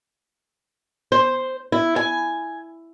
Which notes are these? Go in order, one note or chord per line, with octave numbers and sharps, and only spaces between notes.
C5
E4
G#5